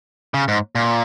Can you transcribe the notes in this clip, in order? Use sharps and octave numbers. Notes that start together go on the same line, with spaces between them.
C#3
G#2
A#2